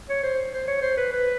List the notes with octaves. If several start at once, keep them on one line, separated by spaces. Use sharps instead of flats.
C#5
C5
C5
C#5
C5
B4
B4